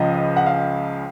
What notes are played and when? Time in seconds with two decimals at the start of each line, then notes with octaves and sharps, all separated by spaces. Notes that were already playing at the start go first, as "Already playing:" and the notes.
Already playing: C#2 C#3 F3 D#5
0.36 F#5
0.46 F5